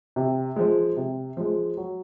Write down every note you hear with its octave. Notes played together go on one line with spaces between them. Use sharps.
C3
F3 G#3
C3
F3 G#3
F#3